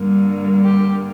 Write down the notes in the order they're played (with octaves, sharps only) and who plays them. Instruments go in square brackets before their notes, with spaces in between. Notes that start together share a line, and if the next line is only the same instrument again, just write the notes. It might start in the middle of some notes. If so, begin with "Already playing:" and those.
Already playing: [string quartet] G2 D3 G3 A#3
G4